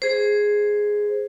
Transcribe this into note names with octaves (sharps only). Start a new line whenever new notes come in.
G#4 C5